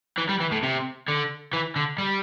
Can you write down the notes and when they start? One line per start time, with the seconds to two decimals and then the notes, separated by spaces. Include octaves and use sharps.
0.18 E3
0.29 G3
0.41 E3
0.52 A2
0.63 C3
1.08 D3
1.53 E3
1.76 D3
1.98 G3